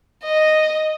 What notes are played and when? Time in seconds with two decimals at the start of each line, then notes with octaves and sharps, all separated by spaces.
0.24 D#5